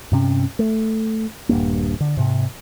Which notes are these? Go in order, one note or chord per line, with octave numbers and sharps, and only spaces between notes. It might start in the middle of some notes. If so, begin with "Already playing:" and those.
G2 C3 C#4
A3
D#1 G2 A#3
D3
G#2 C3